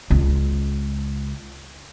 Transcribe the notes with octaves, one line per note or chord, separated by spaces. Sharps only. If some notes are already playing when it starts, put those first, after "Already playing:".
C#2 G#3